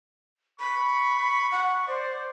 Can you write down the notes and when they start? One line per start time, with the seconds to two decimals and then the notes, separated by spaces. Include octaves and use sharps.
0.60 B5 C#6
1.51 F#5
1.88 C5 D5